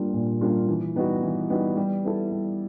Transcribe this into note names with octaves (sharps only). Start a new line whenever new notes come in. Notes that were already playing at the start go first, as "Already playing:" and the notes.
Already playing: G3 A#3 D4 F4
A#2
G3 A#3 D4 F4
E3
G3 B3 D#4 F#4
E3
G3 B3 D#4 F#4
G3
B3 E4 A4
G3